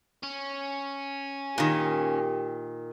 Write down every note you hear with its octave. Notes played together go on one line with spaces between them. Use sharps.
C#4
A#2 D#3 G4